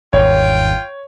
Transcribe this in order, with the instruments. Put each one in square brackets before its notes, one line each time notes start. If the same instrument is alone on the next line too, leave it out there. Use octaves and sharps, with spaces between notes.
[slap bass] G#1 E2 G2 [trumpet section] F4 G5 [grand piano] C#5